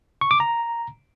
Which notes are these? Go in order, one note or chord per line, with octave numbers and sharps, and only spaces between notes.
C#6
D6
A#5